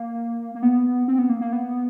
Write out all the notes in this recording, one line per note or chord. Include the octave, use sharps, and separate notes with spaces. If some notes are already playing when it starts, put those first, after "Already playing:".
Already playing: A#3
A#3
B3
C4
B3
A#3
A#3
B3